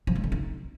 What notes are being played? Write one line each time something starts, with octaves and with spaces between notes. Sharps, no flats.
F3
G#3
D3
D#4